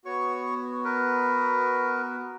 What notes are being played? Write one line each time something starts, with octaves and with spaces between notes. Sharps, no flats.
B3 F#4 C#5 C#6
A#4 B4